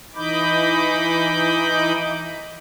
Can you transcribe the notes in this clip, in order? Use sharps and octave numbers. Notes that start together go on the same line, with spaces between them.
E3 D#4 D#5 B5 D6 G6